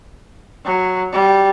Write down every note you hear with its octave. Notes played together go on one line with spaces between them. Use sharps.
F#3
G3